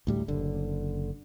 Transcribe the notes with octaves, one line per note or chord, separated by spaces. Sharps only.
D2 A2 G3
F#1 D3